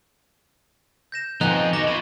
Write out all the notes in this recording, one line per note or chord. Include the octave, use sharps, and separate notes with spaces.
G6 A#6 E7
F2 F3 B3 D#4 G#5 F#6
F#4 A4 D6 A#6 G7
E4 F4 C#6 D#7